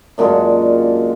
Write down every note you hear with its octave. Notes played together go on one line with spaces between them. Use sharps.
F#2 A#2 D3 G#3